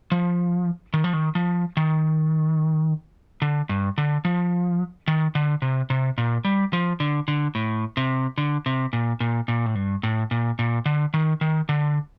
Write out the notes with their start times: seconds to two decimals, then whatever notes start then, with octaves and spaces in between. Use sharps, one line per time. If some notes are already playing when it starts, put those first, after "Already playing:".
0.12 F3
0.94 D#3
1.04 F3
1.13 D#3
1.35 F3
1.77 D#3
3.42 D3
3.69 G2
3.98 D3
4.25 F3
5.08 D#3
5.35 D3
5.62 C3
5.90 C3
6.18 A#2
6.45 G3
6.73 F3
7.00 D3
7.28 D3
7.55 A2
7.97 C3
8.38 D3
8.66 C3
8.93 A#2
9.20 A#2
9.48 A#2
9.66 A2
9.75 G2
10.03 A2
10.31 A#2
10.59 A#2
10.86 D3
11.14 D#3
11.41 D#3
11.69 D3